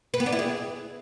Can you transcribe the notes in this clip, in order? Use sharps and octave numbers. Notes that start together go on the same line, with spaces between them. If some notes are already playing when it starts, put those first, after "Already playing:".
B4
B3
D4
E4
G#4